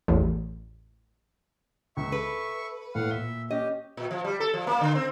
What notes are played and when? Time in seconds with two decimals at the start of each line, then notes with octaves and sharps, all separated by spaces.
0.08 A1 E2
1.97 C#2 E5 C#6
2.12 A4 B4
2.95 A2 F5 F#5
3.11 A#2 E5 G7
3.50 C#4 G4 D#5
3.97 A#2
4.11 F3
4.25 G3
4.40 A4
4.54 F3
4.67 A#3
4.81 D3
4.95 C4